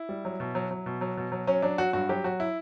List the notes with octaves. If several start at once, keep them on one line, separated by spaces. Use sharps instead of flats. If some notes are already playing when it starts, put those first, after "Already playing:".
Already playing: E4
G3
F#3
B2
F#3
F#3
B2
F#3
B2
F#3
F#3 C#4
F#3 D4
F#3 F#4
G2 F#4
F#3 G4
F#3 F#4
E4